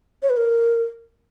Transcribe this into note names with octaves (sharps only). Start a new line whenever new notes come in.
C#5
B4
A#4